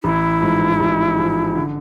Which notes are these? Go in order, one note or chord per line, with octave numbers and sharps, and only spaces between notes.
A1 E4
G#2 F3
A1
G#2 F3
D3